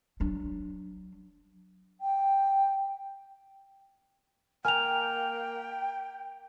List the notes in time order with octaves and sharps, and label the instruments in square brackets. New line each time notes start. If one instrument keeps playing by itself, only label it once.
[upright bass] F#3 D4
[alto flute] G5
[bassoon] A#3 [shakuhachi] G5 [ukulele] G#5 A#5 [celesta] F6 F7